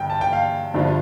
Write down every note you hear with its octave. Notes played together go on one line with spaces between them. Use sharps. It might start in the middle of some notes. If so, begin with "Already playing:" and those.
Already playing: G1 G2 G5
A5
G5
F5
G1 G2 F3 D4 F4